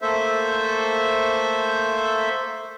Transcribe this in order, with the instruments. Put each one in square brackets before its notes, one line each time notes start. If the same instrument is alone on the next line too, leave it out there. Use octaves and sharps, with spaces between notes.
[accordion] A3 A#3 A4 C5 E5